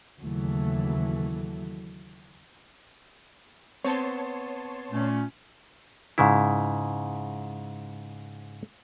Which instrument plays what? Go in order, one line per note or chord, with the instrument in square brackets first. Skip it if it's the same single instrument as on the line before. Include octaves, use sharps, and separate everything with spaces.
[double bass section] D#2 C#3 E3 F#3 A3
[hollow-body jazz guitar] B3 C4 [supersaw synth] C#5 A5 C6
[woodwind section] A#2 A3 C#4
[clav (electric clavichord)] G#2 C#3 E4